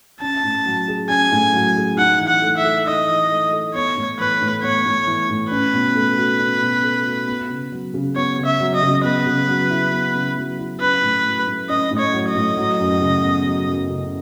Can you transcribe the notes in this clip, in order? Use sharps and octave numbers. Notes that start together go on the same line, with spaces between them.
C#4 A5
A2
F#3
G#4
C#4 G#5
A2
F#3
G#4
D#4 F#5
E3
F#5
A3
E5
A4
D#4 D#5
E3
A3
A4
B3 C#5
A2
E3 B4
A2
B3 C#5
A2
E3
A2
C#4 B4
B2
A3
F#4
C#4
B2
A3
F#4
B3
C#3
F#3
C#3
B3 C#5
C#3
E5
F#3
D#5
C#3
B3 B4
C#3
F#3
E4
B3
C#3
F#3
E4
C#4 B4
A2
F#3
A2
C#4 D#5
A2
C#5
F#3
D#5
A2
F#3
F#2
C#3
B3
F#3
F#2
C#3